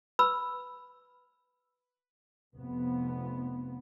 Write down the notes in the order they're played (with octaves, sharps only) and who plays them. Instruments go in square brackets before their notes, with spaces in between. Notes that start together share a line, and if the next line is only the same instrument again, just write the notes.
[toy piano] B4 B5 E6
[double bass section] F1 F2 B3